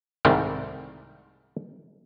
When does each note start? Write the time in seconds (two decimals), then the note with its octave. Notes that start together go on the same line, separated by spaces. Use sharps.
0.25 C2 G#2 D#3 G3 A3 C4